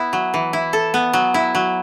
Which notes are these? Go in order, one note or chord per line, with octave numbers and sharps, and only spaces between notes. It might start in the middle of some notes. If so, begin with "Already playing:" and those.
Already playing: B3 E4
F#3
E3
E4
A4
B3
F#3
E4
F#3